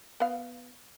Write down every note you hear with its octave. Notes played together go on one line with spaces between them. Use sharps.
B3 F5